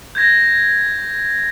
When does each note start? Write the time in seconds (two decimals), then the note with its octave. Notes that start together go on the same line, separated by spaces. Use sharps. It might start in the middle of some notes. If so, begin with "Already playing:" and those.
0.15 G6 G#6 A#6